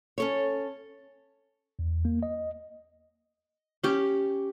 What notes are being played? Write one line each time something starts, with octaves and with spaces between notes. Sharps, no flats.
C#4 A4 C#5
E2
A#3
D#5
C#4 G4